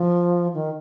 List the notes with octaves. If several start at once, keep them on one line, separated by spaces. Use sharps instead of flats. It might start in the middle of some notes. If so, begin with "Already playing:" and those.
Already playing: F3
D#3